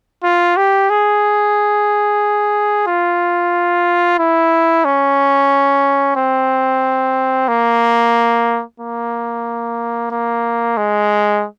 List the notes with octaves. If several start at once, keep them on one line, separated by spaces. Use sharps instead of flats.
F4
G4
G#4
F4
E4
C#4
C4
A#3
A#3
A#3
G#3